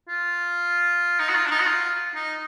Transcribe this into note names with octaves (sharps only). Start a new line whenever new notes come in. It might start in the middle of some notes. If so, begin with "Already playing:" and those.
F4
D#4
F#4
F4
D4
D#4
F#4
F4
D#4